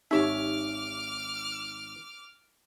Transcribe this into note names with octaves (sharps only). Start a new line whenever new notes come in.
G#1 D#4 G4 C#5 E5 D6 F6